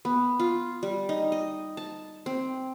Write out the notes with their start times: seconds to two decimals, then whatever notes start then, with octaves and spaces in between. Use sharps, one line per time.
0.05 B3
0.39 F4
0.83 G3
1.09 D#4
1.32 D#5
1.77 A5
2.26 C4